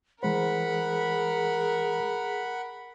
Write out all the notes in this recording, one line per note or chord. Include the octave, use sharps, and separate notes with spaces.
E3 G#3 G#4 A#4 C5 F#5 B5